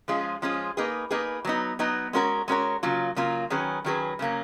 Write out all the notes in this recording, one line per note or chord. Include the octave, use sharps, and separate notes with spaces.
F3 G#3 C#4 F4 G#4
F3 G#3 C#4 F4 G#4
A#3 D#4 G#4 B4
A#3 D#4 G#4 B4
F#3 B3 D#4
F#3 B3 D#4
G#3 C#4 F#4 A#4 C#5
G#3 C#4 F#4 A#4 C#5
C#3 F#3 A#3 F4
C#3 F#3 A#3 F4
D#3 F#3 C#4 G#4 B4
D#3 F#3 C#4 G#4 B4
C#3 F#3 A#3 C#4